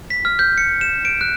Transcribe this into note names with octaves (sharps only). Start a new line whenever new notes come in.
B6
F6
G6
C#7
E7
D7
F#6